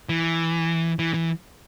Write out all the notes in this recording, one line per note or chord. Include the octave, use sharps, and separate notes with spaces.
E3
E3
E3